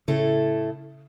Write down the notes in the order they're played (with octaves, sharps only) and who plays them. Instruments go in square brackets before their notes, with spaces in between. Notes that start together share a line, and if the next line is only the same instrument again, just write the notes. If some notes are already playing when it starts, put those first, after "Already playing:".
[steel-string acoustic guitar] A2 A3 E4 A4 [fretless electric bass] C#3